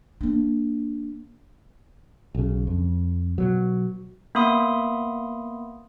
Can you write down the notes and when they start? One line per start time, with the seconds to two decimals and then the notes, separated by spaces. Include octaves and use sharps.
0.21 A#3 D4
2.35 B1 C#3
2.67 F2
3.38 B2 F#3
4.35 A#3 B3 E5 B5 C6 D#6